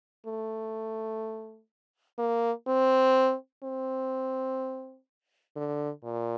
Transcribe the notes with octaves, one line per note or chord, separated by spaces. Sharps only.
A3
A#3
C4
C4
D3
A#2